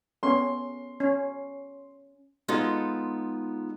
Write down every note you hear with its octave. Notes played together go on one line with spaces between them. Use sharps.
B3 C#4 A4 C6
C#4
G#3 B3 D#4 F4 A4